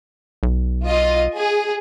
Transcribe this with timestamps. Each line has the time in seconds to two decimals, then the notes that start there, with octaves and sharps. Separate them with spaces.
0.43 B1
0.85 F4 D#5
1.35 G#4